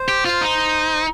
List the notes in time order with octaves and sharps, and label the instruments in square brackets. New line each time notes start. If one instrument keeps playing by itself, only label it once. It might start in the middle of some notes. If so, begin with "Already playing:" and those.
Already playing: [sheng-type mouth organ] C5
[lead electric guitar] G4
F4
D#4